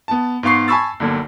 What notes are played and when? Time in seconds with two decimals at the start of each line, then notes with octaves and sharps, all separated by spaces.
0.08 B3 A5
0.43 G#2 B3 F5 C#6 C7
0.68 G#5 A5 B5 C#6 E6 A6
1.00 B1 G2 D3 A#3